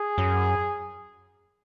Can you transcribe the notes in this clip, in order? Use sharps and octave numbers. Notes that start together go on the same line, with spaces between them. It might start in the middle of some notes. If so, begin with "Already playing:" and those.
Already playing: G#4
F#2